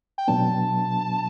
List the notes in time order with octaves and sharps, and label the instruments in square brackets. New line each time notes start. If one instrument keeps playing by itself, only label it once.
[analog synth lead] G5
[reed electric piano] B2 F#3 B3 D4 [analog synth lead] A5